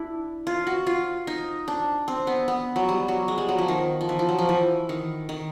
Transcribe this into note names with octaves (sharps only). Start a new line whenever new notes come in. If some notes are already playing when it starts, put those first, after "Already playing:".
Already playing: D4 E4
F4
F#4
F4
D#4
D4
C4
B3
B3
F#3
G3
F#3
G#3
G3
F#3
F3
D#3
F3
E3
F3
F#3
F3
E3
D#3
D#3